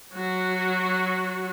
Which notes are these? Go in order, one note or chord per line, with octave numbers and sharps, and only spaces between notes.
F#3 F#4